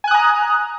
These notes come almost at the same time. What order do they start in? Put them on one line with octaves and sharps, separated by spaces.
G#5 F#6 D#6 A#5